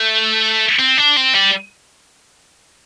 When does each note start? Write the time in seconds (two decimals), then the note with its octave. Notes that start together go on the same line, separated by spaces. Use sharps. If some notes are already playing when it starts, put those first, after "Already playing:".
Already playing: A3
0.79 C4
0.98 D4
1.16 C4
1.35 G3